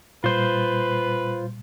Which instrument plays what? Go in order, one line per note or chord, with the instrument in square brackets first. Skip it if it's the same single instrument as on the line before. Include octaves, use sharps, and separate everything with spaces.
[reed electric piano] A#2 G3 [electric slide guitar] F4 C5 [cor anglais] B4